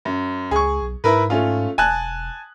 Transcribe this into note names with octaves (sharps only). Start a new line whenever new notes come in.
F#2
C#2 G#4 C#6
B1
G#2 E4 A#4 B4
A3 C#4 F4
E1 G#5 A5 F#6